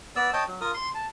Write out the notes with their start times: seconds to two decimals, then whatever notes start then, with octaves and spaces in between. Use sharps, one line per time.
0.16 B3 D5 E6
0.33 C#5 D#5 G5 A5
0.47 F#3
0.61 F4 A#4 D#6
0.74 C6
0.95 A5